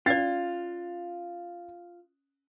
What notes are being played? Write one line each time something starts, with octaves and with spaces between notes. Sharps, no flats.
C#4 F4 D5 A6 C7